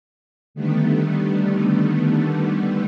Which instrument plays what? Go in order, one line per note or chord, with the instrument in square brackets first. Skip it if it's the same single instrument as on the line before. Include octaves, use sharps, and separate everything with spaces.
[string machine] D3 D#3 G3 A3 B3